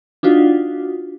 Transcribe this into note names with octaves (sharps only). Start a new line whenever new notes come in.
D4 D#4 F4 F#4